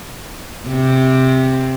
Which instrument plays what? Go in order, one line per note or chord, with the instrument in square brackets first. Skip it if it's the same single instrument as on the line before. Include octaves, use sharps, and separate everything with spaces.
[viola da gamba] C3